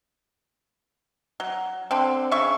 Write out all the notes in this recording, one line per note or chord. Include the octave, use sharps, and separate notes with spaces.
F#3
D3 C4
C#3 E5 C#6